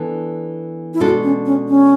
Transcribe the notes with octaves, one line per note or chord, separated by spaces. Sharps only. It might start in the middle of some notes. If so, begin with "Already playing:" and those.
Already playing: E3 B3 D4 A4
E4
B2 G#3 D4 F#4 A4
C#4
C#4
C#4